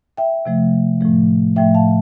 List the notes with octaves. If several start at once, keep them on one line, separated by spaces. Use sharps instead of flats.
E5 G5
C3 F3 A3
A2 F3 A3
A2 F3 A3 E5 G5
F5 A5